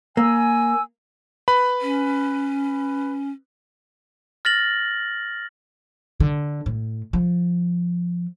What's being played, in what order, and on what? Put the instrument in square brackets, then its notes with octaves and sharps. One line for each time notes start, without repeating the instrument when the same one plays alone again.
[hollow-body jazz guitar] A#3 [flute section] G#5 E6
[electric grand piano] B4 B5
[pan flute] C#4
[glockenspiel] F6 A6 A#6 F#7
[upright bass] D3
A2
F3